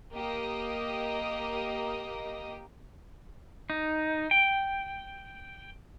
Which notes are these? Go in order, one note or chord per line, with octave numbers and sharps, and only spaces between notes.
A#3 G4 A#4 D#5 D#6
D#4
G5